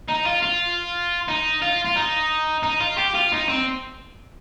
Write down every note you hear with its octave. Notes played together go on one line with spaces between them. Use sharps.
D#4
F4
F4
D#4
F4
F4
D#4
D#4
F4
G4
F4
D#4
C4